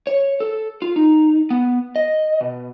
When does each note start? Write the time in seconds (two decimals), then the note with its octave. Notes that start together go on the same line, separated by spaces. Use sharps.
0.07 C#5
0.40 A4
0.82 F4
0.96 D#4
1.50 B3
1.96 D#5
2.41 B2